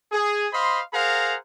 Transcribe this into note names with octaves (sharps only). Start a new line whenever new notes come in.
G#4
C5 D#5 F5 B5 C6
G#4 A#4 C5 F5 F#5 A#5